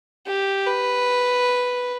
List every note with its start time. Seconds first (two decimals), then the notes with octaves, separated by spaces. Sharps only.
0.27 G4
0.67 B4